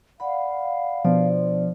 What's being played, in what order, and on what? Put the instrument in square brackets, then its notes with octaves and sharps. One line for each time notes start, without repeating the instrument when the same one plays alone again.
[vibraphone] D5 F#5 B5 [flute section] F5
[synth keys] B2 B3 D4 [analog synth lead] F3 [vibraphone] D5